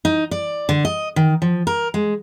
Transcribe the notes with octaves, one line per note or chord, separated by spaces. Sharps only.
D#4
D5
D3
D#5
D#3
F3
A#4
G#3